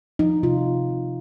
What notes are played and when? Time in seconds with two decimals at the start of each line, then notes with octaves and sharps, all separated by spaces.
0.19 F3 D#4
0.43 C3 F4
0.67 C4
0.90 C3